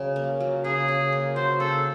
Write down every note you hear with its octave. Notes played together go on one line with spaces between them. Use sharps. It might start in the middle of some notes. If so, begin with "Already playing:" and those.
Already playing: C#3 F#3
A#3
F#3
C#3 G#4
C#3
A#3
F#3 C5
C#3 A4